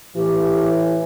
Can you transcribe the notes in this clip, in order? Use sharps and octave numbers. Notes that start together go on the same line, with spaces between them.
A2 E3 G4